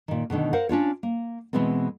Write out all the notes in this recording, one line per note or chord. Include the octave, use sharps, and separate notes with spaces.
A#2 D#3
B2 D3 D#3 A3
A#4 C5 F5 F#5
C#4 D4 F4 C#5
A#3
B2 E3 G#3 B3 C4